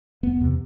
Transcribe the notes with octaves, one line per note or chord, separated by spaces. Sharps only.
E1 B3
E2 C3